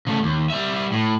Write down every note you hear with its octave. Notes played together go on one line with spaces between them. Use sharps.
C#3 A3
D#2
G3 E5
A2